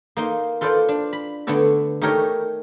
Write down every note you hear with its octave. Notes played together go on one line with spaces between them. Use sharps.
A#3 D#4 C6
F4 A4 B4 C5 D5
D4
B5
D3 A3 B3 D4 A4
A3 D#4 G4 A#4 C#5